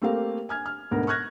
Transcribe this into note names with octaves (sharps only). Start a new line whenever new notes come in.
A3 A#3 C4 G4 A#4 F5
G#5 F6 G#6
F6
D2 G#2 B2 B3 A#4
C#6 F6 F#6 G#6 A#6